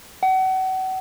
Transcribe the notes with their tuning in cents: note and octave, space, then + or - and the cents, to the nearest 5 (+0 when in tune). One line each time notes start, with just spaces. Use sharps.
F#5 +35